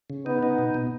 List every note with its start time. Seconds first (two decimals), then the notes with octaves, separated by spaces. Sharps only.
0.10 C#3
0.26 B3 D#4
0.43 D#4
0.58 B2
0.74 B2